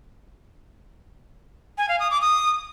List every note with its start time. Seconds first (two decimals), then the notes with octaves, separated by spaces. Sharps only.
1.78 G#5
1.89 F5
2.00 D#6
2.11 D6
2.22 D#6